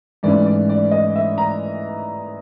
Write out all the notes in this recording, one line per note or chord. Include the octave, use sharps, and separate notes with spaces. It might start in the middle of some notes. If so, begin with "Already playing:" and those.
G#2 E3 A3 C#4 D5
D5
D5
D#5
E5
A#5